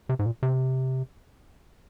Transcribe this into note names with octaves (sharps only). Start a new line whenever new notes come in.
C3
G#2
A#2
C3